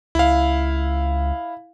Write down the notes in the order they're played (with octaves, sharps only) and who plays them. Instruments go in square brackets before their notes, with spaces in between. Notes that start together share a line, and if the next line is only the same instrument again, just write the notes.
[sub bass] C#2 [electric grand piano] E4 F5